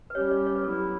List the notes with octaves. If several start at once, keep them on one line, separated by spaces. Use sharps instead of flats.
B4
G3 C#4 G4 C#5
D5
C#5
B4
F#3 B3 E4 A4
B4